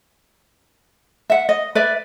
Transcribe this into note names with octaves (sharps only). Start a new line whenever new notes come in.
E5 F#5
D#5
B4 D5 E5